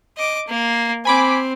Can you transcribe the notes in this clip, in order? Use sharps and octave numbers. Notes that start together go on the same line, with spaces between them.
D#5 D6
A#3
C4 G#5 B5 D6